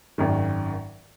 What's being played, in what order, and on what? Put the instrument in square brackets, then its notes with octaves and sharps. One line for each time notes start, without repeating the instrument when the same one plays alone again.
[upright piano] G#1 F#2 D#3